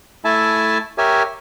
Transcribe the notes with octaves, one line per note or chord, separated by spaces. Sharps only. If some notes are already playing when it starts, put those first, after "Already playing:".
A3 E4 E5 G#5 A5
G4 A#4 C#5 E5 G#5